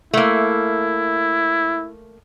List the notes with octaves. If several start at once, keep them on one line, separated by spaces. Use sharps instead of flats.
A3 A#3 E4